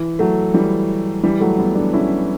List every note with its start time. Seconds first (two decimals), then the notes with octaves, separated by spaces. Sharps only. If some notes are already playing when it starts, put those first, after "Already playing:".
Already playing: E3
0.19 F#3 A3
0.54 E3 G3
1.23 E3 G3
1.40 F#3 A3
1.59 G3 B3
1.75 B3 D4
1.93 C#4 E4